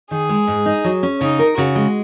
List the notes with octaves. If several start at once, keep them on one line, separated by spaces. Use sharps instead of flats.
D#3 G#4
G#3
G#2
D#4
F#3
C#4
C#3 D#4
A#4
C#3 F#4
G#3